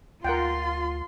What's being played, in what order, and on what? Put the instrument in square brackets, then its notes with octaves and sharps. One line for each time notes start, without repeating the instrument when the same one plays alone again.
[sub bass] D2 [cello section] F4 [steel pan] A#4 F#5 G5 [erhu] C6